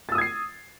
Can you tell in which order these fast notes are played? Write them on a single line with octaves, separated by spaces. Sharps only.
A6 E6 D#6 G#6 C7